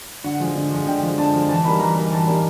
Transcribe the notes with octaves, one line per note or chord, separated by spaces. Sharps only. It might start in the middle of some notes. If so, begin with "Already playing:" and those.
D3 F#5
F3 G#3
D3
F3 G#3
D3 G5
F3 G#3
D3 A5
F3 G#3
E3 A5
G3 A#3 D#4 B5
E3 A#5
G3 A#3 D#4
E3 A5
G3 A#3 D#4